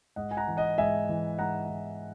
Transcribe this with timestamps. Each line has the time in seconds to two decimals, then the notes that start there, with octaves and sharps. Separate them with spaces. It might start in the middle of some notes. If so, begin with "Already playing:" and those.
0.16 G#2 D#5 F#5
0.31 G#5
0.37 F#5 A#5
0.47 E3
0.57 D#5 F#5
0.78 G#2 E5 G#5
1.09 E3
1.39 G#2 F#5 A#5
1.69 E3